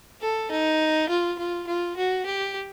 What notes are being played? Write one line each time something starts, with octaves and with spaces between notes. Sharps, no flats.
A4
D#4
F4
F4
F4
F#4
G4